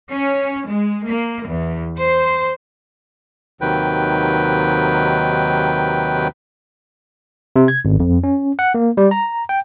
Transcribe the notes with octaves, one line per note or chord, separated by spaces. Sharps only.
C#4
G#3
A#3
E2
C5
D#2 C3 D#3 F#3 B4 G5
C3
G#6
G#1
F2
C#4
F#5
A#3
G3
A#5
G5